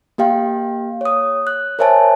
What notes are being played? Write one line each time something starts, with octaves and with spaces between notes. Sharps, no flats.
A#3 G4 F5 G5
C#5 D#6
F#6
A#4 C5 C#5 E5 G#5 A5